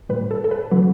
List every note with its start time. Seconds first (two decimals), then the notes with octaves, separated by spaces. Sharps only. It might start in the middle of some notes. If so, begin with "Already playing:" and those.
0.09 A2 G3 B4
0.31 A4
0.44 A4
0.51 B4
0.71 C#3 F#3 B4